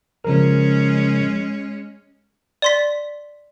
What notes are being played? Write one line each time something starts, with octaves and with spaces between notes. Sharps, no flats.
C#3 F3 G#3 C#4 A#4
D5 C6 B6